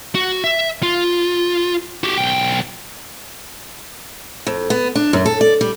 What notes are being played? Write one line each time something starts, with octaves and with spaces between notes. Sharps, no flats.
F#4
E5
F4
F#4 G4
B1 G5
F2
B3
D4
F#2
A4
D5
G3